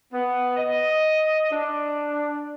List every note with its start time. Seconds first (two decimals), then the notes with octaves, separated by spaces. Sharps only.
0.13 B3
0.57 D#5
1.51 D4